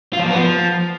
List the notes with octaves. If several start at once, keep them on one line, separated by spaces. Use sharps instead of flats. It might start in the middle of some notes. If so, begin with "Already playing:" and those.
F4
F3
A#3
B3
F3